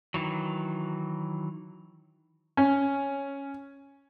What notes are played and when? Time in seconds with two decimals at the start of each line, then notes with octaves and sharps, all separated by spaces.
0.14 D#3 E3 F#3
2.57 C#4